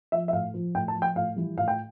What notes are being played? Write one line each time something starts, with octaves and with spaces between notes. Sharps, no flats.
F3 E5
E5
A2 F5
F3
A2 G5
A5
F3
G5
A2 F5
E3 G3
A2 F5
G5